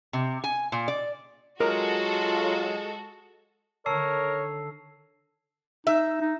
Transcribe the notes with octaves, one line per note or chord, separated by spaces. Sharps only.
C3
G#5
A#2
D5
F#3 G#3 F4 F#4 A4 A#4
D3 D#3 A3 A#4 C#5 A5 E6 C7
D#4 E5
D#4